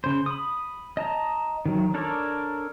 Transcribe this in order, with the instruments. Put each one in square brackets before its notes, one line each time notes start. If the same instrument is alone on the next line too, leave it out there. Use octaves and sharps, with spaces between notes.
[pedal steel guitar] C#3 C5
B5 D#6
D#5 A5 A#5
D#3 F#3
D4 A4 A#4 C#5 D5